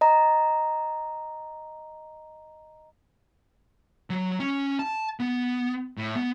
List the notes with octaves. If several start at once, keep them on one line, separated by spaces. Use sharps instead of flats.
D#5 A#5
F#3
C#4
A5
B3
A2
B3